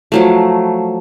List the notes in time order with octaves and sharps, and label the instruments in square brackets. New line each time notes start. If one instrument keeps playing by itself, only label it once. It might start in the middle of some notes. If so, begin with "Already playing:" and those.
[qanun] F3 F#3 A3